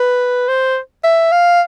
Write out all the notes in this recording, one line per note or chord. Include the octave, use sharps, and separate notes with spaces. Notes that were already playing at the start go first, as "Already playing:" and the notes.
Already playing: B4
C5
E5
F5